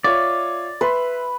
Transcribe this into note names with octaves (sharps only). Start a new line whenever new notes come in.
F4 C#5 D5 E5
B4 E5 C6